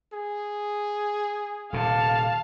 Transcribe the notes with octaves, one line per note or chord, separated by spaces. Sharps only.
G#4
D#1 C3 F5 A5